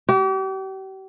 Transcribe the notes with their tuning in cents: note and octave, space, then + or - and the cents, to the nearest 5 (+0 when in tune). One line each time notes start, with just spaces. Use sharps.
G4 -40